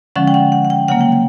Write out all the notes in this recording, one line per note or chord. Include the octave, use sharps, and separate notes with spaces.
D3 F3 G#3 C#4 F#5
G5
F#5
F#5
F#5
G5
C#3 F#3 A#3 F#5
G5
G5